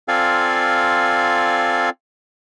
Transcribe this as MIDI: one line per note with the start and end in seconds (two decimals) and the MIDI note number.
0.08 1.90 60
0.08 1.90 65
0.08 1.90 69
0.08 1.90 74
0.08 1.90 77
0.08 1.90 80